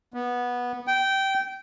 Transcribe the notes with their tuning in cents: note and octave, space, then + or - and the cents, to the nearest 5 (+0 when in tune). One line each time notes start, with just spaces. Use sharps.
B3 -15
G5 -15